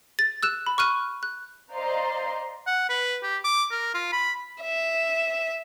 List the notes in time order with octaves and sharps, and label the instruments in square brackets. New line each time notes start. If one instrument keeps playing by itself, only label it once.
[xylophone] A6
E6 F#6 E7
B5
C#6 F6 F#6 D#7
F#6
[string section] C5 D5 D#5 F5 A#5 C6
[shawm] F#5
B4
G4
D6
A#4
F4
B5
[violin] E5